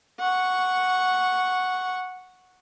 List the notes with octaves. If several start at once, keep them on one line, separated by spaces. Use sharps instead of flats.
F#5 C#6